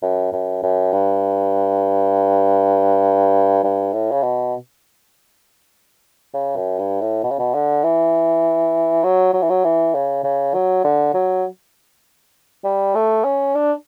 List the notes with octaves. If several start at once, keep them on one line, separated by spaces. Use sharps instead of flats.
F#2
F#2
F#2
G2
G2
A2
C#3
B2
C#3
F#2
G2
A2
B2
C#3
B2
D3
E3
F#3
F#3
E3
F#3
E3
C#3
C#3
F#3
D3
F#3
G3
A3
C#4
D4